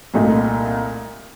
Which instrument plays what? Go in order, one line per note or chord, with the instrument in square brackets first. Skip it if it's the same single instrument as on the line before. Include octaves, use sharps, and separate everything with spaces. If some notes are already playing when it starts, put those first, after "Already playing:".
[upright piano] C2 A#2 A3 D#4